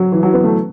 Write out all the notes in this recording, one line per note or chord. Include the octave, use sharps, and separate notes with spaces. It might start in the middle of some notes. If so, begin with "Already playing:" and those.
Already playing: F#3
E3
F#3
B3
A3